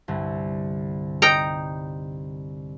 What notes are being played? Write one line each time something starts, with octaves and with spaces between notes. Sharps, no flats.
C2 G2 D3
D#4 G5 A#5